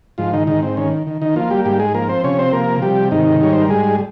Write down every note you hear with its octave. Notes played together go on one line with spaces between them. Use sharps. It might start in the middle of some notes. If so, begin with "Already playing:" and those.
G#2 F3 F4
D#3 D#4
G#2 D#3 D#4
C4
D#3 C#4
D#3
D#3 D#4
F3 A#3 F4
G3 G4
G#2 G3 G4
G#3 G#4
F3 A#3 A#4
C4 C5
C3 C#4 C#5
C4 C5
F3 A#3 A#4
C3 G3 G4
G#2 D#3 D#4
G3 C#5
C5
A#4
G#2 G#3 G#4